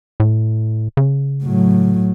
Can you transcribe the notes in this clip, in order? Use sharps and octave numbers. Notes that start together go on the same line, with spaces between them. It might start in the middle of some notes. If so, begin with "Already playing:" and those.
A2
C#3
A2 F#3